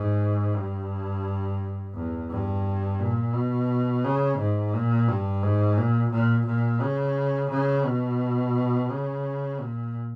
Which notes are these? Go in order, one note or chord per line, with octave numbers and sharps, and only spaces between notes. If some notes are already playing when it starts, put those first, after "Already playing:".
Already playing: G#2
G2
E2
G2
A#2
B2
C#3
G#2
A#2
G2
G#2
A#2
A#2
A#2
C#3
C#3
B2
C#3
A#2